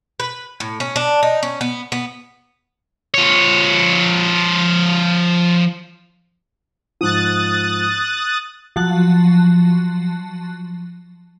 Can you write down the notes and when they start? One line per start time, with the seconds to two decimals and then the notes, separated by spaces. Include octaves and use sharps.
0.20 B4
0.60 A2
0.80 C#4
0.96 D4
1.23 D#4
1.43 C#4
1.61 B3
1.92 B3
3.14 F3 C#5
7.01 G#2 F3 D#6 F#6 A6
8.76 F3 F#3 A5 F#6